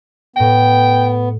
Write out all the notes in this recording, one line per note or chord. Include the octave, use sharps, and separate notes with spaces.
A2 B3 G5 A#6